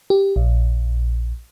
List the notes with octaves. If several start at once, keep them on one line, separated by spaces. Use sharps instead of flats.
G4
A#1